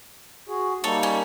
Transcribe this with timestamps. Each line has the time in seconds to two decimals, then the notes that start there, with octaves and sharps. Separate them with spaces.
0.48 F#4 G#4
0.84 G3 A#3 D#4 A4 C#5
1.03 C#4